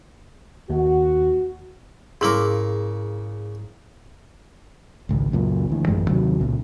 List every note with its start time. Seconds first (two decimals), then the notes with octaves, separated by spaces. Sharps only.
0.70 D#2 F#4
2.21 G#2 C#3 A#3 E4 A#4 D6
5.09 G#1 C#2
5.32 C#2 F#2 A#2
5.69 D2 E3
5.87 A1 F#2 E3 G#3
6.09 D#2 C3 D#3 F#3
6.40 C#2 A#2 C#3